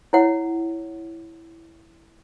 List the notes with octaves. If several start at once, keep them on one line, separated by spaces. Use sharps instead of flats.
E4 C#5 F#5